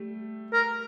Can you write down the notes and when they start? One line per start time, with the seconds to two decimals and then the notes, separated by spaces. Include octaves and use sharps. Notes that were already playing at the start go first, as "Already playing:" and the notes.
Already playing: G3 A3
0.53 A#4